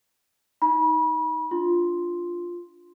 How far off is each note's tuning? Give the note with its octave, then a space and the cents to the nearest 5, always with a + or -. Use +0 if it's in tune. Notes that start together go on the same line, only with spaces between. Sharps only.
D#4 +15 B5 -35
D4 +0 F4 +0 C6 +0